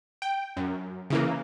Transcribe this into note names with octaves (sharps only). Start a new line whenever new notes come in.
G5
F#2
C#3 E3 A#3